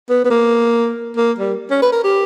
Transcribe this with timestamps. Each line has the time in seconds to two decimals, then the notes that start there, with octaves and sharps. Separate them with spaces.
0.10 B3
0.25 B3
0.30 A#3
1.17 A#3
1.38 G3
1.71 C#4
1.82 B4
1.92 A#4
2.04 G4